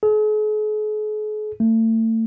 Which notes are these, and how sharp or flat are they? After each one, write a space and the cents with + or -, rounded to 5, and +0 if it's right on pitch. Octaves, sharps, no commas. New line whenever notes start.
G#4 +45
A3 +35